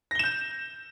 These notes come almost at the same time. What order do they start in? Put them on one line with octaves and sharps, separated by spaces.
A#6 G7 E7 G6